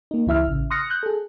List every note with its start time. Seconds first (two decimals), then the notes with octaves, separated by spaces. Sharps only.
0.11 A#3 D#4
0.26 C#2 E3 E4 E5 F6
0.47 A1 C#3
0.70 C6 D#6 F6 F#6 A#6 C#7
0.90 F#6 G6
1.03 G#4 A4